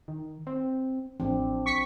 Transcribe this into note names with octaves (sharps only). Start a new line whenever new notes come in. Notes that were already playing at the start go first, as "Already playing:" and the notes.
D#3
C4
A1 F3 C4 D4
C#6 B6 C#7